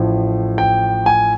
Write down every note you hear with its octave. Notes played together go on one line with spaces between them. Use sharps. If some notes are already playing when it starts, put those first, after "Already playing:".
Already playing: A1 A2 F3
G5
G#5